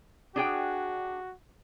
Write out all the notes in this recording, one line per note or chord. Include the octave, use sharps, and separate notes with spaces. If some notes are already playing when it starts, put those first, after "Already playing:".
D4 F#4 G#4 G5